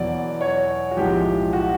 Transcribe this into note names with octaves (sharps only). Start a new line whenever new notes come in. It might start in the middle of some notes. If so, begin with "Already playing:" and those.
Already playing: E2 B2 F#3 D5
C#5
F#4
B1 A2 F3 G#3 G4
F#4